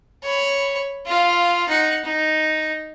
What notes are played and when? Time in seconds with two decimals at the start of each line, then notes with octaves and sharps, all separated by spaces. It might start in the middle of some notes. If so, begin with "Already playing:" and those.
0.24 C#5 B5
1.06 F4 F5
1.69 D#4 F#5
2.05 D#4